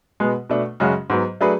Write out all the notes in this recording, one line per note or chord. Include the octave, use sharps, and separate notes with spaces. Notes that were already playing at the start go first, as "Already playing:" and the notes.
B2 G#3 B3
B2 A3 D4
F#2 C#3 G#3 C#4 F#4
G#2 F#3 B3
F#3 A3 D4 G#4 B4